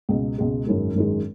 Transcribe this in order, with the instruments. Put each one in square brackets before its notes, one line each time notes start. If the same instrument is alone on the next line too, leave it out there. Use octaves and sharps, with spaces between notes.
[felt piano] C#2 B2 G#3
C#2 B2 G#3
G#1 F#2 D#3 G#3
G#1 F#2 D#3 G#3